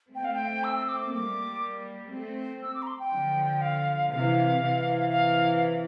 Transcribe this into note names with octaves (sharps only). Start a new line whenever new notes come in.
A3 C4 G5
F5
G5
E6
E6
D6
D6
G3 A#3 D6
A3 C4
E6
D6
A#5
C6
G5
D3 F3
F5
C3 E3 F5
C3 E3
F5